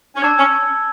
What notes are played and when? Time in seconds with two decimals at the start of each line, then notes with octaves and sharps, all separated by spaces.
0.16 C#4
0.22 D4 A5 E6 G#6
0.37 C#4